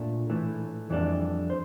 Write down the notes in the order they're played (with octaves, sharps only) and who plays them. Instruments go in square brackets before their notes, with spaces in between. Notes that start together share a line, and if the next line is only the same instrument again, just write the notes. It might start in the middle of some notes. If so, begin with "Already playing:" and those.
Already playing: [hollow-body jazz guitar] A#2 A3 D4
A2 E3 A3
F2 E3 G3 D4 A4
C5